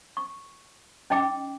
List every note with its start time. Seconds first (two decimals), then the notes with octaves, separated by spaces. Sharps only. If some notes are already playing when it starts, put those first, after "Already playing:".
0.17 C#6
1.10 C#4 D#4 D#5 G5 D6